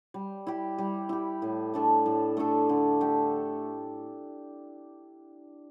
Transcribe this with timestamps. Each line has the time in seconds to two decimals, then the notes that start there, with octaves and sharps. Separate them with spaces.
0.14 G3
0.47 E4 G4
0.78 G3
1.09 E4 G4
1.42 A2
1.74 A3 D4 A4
2.06 A2
2.37 A3 D4 A4
2.69 D3
3.01 A3 G4